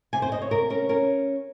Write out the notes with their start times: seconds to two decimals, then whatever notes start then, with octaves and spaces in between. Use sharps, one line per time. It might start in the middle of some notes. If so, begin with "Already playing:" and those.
0.13 C3 G#5
0.22 C5
0.32 C3 D#5
0.42 C#5
0.51 C3 A#4
0.70 C#4 A#4
0.89 C#4 A#4